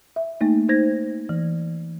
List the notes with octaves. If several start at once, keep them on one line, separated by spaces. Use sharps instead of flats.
E5
A3 A#3 D#4
D#4 C5 G#6 A#6
E3